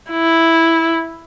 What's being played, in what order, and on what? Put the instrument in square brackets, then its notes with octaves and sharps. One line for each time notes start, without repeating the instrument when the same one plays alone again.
[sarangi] E4